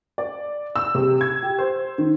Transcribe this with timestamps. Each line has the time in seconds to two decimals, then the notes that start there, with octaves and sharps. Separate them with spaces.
0.18 D5
0.76 E6
0.95 C3
1.21 G#6
1.43 G4
1.58 C5
1.98 D#3